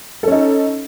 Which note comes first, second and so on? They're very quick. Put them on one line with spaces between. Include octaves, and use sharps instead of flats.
A4 C#4 D#4